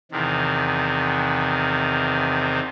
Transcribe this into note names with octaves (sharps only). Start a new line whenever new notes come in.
E2 C3 D#3